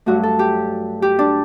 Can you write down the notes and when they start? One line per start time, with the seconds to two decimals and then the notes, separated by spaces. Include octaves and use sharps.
0.06 G2 F#3 A3 F#4
0.23 A4
0.39 G4
1.02 G4
1.19 D4